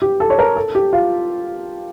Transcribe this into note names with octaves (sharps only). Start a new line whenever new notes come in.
G4
A4
C#5
A#4
A4
G4
F4